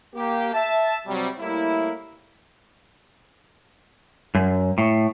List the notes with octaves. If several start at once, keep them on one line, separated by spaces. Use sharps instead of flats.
A#3 G4
E5 A5
C3 F#3 G3
A2 G3 A#3 E4
F#2
A2